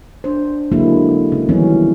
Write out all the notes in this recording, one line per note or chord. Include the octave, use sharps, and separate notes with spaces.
D4 C5
D3 F#3 G#3 A#3 E4
C#3
D#3 E3 F#3 G3 B3 C#4